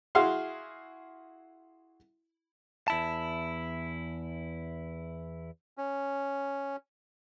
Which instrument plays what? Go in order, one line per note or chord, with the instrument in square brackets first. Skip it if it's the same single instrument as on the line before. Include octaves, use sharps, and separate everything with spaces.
[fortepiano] E4 F#4 G#4 F5 C6
[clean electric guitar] E2 E4 A5
[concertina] C#4